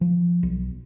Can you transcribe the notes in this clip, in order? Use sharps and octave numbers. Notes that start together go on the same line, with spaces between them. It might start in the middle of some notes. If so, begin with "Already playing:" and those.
F3
B1